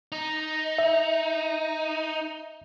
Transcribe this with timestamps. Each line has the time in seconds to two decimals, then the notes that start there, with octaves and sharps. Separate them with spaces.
0.12 D#4
0.79 E5